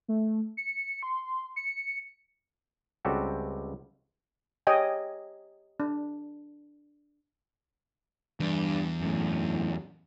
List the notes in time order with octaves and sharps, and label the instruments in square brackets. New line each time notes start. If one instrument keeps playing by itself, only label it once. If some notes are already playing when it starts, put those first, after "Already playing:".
[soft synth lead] A3
C#7
C6
C#7
[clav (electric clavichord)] C#2 G3 C4 F#4 G4 A4
[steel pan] G4 C#5 D#5 G5 G#5
D4
[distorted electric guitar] E2 [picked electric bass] G2
[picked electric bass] F#2 A2